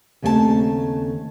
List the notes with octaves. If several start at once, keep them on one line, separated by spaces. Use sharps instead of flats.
D#2 C#3 A3 C4 G#4 A5